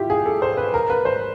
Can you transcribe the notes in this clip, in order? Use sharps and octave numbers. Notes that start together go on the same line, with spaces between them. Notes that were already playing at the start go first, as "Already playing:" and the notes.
Already playing: E4 F4 G4
G#4
A4
C5
B4
A#4
B4
C5